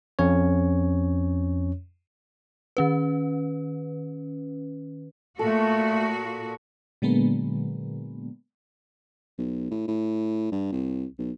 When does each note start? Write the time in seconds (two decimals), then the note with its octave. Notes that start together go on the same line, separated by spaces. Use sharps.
0.19 F2 C#4 C#5
2.77 D#3 C#4 B4
5.39 A#2 A3 F#4 A4
7.02 A#2 D3 F#3 G#3 A#3 B3
9.38 B1
9.71 A2
9.88 A2
10.52 G2
10.72 C2
11.19 B1